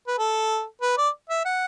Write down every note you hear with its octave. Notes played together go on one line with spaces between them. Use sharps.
B4
A4
B4
D5
E5
F#5